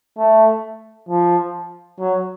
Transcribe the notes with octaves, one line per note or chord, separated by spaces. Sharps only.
A3
F3
F#3